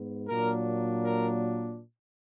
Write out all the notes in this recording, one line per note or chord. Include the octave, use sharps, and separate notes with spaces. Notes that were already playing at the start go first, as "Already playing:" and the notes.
Already playing: G#2 B3
A#2 F#3 A#3 D4 A#4
A#4